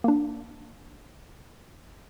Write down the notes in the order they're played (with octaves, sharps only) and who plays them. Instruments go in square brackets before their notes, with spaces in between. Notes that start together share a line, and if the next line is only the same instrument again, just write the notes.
[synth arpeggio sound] A#3 D4